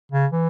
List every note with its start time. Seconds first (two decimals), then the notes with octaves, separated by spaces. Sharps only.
0.11 C#3
0.33 E3